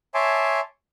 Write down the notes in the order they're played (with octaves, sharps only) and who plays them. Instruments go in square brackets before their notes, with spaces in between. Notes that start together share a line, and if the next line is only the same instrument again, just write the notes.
[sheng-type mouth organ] C#5 E5 G#5 A5 C6 D6